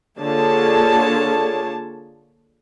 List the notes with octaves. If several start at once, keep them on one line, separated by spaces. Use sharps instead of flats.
D3 A#3 F4 G#4 C#5 A5